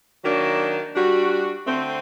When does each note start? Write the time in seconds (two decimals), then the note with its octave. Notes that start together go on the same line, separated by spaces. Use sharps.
0.24 D#3 F#3 A#3 D4 F#4
0.95 G3 D4 F#4
1.67 D3 A3 C4